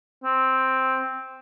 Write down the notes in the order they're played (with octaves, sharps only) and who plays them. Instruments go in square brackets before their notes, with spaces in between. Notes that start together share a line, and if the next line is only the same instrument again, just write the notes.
[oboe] C4